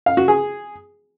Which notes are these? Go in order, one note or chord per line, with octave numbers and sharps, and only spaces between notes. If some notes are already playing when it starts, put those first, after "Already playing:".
F5
F#4
G#4